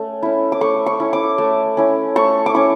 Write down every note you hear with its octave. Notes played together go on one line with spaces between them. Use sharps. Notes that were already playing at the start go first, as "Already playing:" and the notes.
Already playing: A3 C#4
C#4 E4
D6
A3 C#6
C#6
C#4 E4
D6
A3
C#4 E4
A3 C#6
D6
C#4 E4 C#6